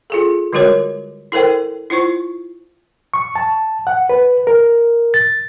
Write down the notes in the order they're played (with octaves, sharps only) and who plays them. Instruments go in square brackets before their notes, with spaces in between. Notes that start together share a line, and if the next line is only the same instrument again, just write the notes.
[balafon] F4 G#4 A4
D3 G3 G#3 F#4 A#4 C#5
E4 A4 A#4 C5 G5
E4 F4 C5 C#6
[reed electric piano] C#6
A5
F#5
B4
A#4
A6